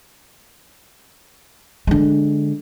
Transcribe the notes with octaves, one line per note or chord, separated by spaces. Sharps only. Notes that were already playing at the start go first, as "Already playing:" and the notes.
D3 G#3